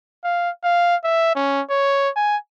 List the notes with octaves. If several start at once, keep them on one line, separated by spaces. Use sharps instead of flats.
F5
F5
E5
C#4
C#5
G#5